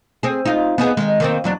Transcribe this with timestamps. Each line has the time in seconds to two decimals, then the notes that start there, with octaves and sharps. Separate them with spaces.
0.23 C4 G#4
0.45 D#4 F4
0.78 B3 D#4 G#4
0.97 D#3 G#3
1.20 D#3 A#3 C4
1.44 E2 F#3 D4